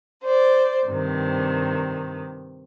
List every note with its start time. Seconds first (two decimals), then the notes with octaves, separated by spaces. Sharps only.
0.22 C5 D5
0.86 G2 C3 D#3